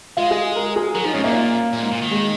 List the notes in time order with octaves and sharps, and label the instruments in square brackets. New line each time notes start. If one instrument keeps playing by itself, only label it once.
[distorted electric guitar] G#3 [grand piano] F4
[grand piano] G#4
A#4
G#4
[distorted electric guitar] F#3 [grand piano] A#4
[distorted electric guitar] F3 [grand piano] D#4
[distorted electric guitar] G#2 [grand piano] C#4
[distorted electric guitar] A#2 [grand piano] A#3
[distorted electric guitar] A#2
G#2
A#2
D#3
[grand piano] G#3